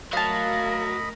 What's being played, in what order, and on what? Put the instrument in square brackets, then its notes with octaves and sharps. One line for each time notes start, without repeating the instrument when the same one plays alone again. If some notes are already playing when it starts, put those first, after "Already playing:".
[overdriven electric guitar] F#3 [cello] A3 A#4 [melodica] D#5 B5 [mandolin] F5 A5